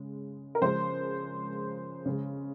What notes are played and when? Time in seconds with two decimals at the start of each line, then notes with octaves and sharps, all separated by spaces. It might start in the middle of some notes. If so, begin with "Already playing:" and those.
Already playing: C#3 G#3
0.55 A#4
0.61 C#3 F3 G#3 C5
2.06 C#3 G#3